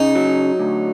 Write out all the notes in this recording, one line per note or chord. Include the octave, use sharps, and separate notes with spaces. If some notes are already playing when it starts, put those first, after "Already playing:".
Already playing: C#3 D#4
F#3
D2